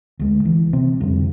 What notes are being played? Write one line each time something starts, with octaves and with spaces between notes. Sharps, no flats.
D2 G#3
E3
C3 C4
F2 D3 G3